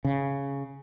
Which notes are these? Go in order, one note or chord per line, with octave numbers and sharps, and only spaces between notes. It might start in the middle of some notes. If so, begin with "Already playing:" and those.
C#3